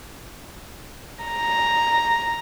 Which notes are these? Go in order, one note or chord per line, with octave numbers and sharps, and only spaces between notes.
A#5